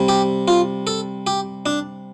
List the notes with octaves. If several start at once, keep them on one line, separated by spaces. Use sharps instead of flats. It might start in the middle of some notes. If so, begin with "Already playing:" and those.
Already playing: C3 G3
G4
F4
A4
G4
D4